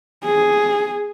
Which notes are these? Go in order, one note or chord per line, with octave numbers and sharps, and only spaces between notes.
G#4